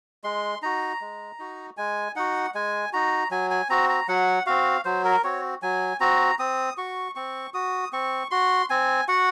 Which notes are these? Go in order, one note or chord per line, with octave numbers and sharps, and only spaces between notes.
G#3 C6
D#4 F#4 A#5
G#3
D#4 F#4
G#3 G#5
D#4 F#4 F#5
G#3 G#5
D#4 F#4 A#5
F#3 G#5
G#5
C4 F#4 A#5
A#5
F#3 F#5
C4 F#4 F5
F#3 C5
A#4
C4 F#4 C#5
F#3 G#5
C4 F#4 A#5
C4 D#6
F#4 C#6
C4 C#6
F#4 D#6
C4 C#6
F#4 C6
C4 G#5
F#4 F#5